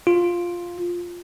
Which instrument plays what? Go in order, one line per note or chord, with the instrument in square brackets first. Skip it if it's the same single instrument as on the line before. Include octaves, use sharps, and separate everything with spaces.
[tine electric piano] F4